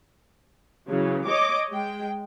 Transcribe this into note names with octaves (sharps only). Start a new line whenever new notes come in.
C#3 E3 F#3
C#5 D#5 D6
G#3 G5